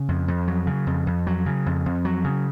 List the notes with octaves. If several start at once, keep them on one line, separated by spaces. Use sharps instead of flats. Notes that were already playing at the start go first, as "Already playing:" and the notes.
Already playing: C#3
F2
F2
F#3
C#3
F2
F2
F#3
C#3
F2
F2
F#3
C#3